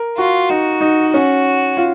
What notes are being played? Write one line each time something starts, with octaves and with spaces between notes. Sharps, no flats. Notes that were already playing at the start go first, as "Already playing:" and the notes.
Already playing: A#4
F4 F#4
D#4 F#4
D#4
C#4 F#4
F4